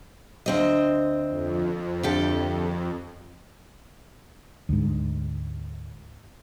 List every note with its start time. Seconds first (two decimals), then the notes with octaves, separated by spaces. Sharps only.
0.46 D2 C4 D#5
1.29 F2
2.03 D2 G4 A4
4.69 D2 G#2